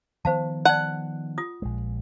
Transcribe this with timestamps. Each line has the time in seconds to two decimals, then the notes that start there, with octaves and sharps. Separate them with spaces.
0.25 D#3 F3 B3 C5 F5 A5
0.65 D5 F#5 A5
1.38 F4 D#6
1.62 A#1 G#3